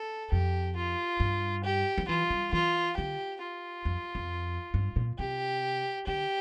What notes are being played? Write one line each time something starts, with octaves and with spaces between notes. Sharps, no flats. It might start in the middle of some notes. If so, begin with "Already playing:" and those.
Already playing: A4
F2 G4
F4
G2
G4
F3
E3 F4
G3
E3 F4
D3 G4
F4
F2
F2
G2
A#2
C3 G4
D3 G4